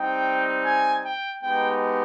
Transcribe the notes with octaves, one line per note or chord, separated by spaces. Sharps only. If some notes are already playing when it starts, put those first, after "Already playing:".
Already playing: G3 C4 D#4 G5
G#5
G5
G#3 B3 D#4 G4 G5